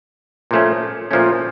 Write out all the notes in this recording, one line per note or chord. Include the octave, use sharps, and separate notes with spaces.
A#2 F3 A3 C#4
A#2 F3 A3 C#4